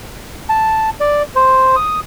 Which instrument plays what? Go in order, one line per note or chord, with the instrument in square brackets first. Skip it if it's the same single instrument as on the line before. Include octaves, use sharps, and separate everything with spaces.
[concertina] A5
D5
C5
D#6